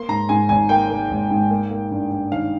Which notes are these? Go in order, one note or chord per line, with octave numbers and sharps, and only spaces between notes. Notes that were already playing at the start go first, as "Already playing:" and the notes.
Already playing: A#3 C6
G#2 A#5
G#2 G#5
G#1 G#5
A#3 G5
A#3
G#1
G#2
A#3
A#3
G2
G2
D#3 F5